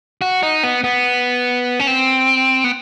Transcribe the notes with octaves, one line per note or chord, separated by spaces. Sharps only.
F#4
D#4
B3
B3
C#4
C4
B3